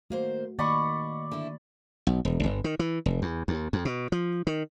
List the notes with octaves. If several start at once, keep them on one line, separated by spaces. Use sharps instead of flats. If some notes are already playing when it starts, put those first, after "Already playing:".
D#3 A3 A#3 F#4 C5
D#3 A#3 D5 D#5 F#5 B5 C#6
D3 E4
B1
E1
G1
D#3
E3
F1
E2
D#2
F2
B2
F3
D#3